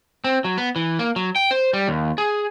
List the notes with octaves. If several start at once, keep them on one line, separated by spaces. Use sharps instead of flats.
C4
F#3
B3
E3
A#3
F#3
G5
C5
G3
D#2
G#4